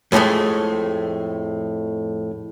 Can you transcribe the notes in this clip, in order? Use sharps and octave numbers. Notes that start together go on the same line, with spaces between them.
F2 A2 D3 G#3 A3